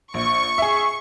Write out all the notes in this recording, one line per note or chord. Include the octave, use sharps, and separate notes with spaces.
A#1 C#6
G#4 E5